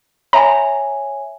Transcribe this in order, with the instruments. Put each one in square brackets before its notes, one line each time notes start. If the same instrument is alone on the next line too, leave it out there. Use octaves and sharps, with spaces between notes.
[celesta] C#5 E5 G#5 [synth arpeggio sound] A#5